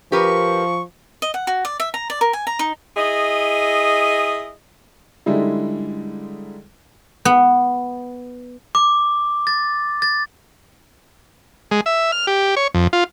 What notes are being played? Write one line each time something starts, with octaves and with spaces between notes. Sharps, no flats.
F3 G4 A#4 B4 C#6
D#5
F#5
F#4
D5
E5
A#5
D5
A#4
G#5
A#5
D#4
E4 G#4 D#5
D3 G3 G#3 D#4 E4
B3
D6
A6
A6
G#3
E5
F6
G4
C#5
F2
F4